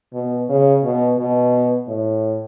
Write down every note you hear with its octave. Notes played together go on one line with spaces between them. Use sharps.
B2
C#3
B2
B2
A2